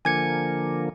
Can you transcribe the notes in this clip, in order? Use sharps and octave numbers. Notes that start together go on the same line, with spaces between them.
D3 F3 A#3 G#5 G#6 C#7